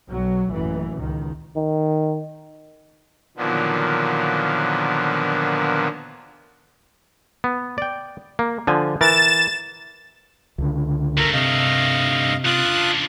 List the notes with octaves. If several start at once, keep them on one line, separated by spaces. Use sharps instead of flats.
B1 F#3
A1 F#2 A#2 E3
C#2 D#3
D#3
A#2 D3 D#3 F3 F#3 B3
B3
D5 G5
A#3
D3 F3 G#5
E3 A#4 A6 E7
C#2 D3
G2 A3 A#4
C3 D#5 F5
C#2 D4 F4 D#6 F#6